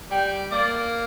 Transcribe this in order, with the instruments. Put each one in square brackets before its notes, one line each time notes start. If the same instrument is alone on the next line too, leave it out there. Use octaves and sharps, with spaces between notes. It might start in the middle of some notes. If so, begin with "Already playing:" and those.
[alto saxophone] G3 [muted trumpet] G5
[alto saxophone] A#3 [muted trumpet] D5